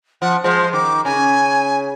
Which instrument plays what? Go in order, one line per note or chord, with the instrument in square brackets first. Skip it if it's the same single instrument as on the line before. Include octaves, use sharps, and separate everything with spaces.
[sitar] F3 [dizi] F#5
[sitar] F3 G#3 [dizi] C5
[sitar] D#3 [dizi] D6
[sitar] C#3 [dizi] G#5